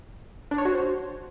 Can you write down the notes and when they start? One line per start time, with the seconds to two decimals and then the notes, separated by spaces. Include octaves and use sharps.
0.51 D4
0.58 C#5
0.65 F#4
0.72 C5